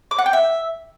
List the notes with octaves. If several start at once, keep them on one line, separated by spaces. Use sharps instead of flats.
D6
F#5
G5
E5